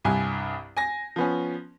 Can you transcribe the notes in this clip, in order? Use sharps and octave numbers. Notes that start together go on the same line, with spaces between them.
C2 G2 G#5
G#5 A#6
F3 B3 C#4